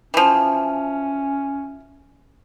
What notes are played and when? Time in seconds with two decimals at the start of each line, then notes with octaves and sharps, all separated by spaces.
0.14 E3 F3 C#4